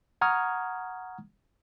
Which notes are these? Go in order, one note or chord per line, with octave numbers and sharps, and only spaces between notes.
F#5 A#5 C#6 D#6 F6 G#6